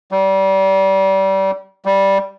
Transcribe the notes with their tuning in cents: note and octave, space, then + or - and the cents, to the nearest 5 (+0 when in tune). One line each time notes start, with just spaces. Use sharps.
G3 -30
G3 -5